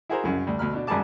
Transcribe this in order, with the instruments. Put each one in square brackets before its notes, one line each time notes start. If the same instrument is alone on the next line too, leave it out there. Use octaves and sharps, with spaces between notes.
[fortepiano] E4 F#4 G#4 A#4 C5 A#5
C2 F#2 C#3
D2 G3
D2 B2 B5 F6
B2 D4
G#1 F#2 G3 G#4 A5 D6